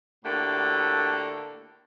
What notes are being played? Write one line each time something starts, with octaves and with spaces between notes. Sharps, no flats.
A2 D3 A3 A#3 F#4 G4